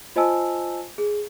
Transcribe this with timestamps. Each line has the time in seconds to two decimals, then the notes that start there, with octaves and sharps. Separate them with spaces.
0.16 F4 C5 D#5 G#5 A5 E6
0.98 G#4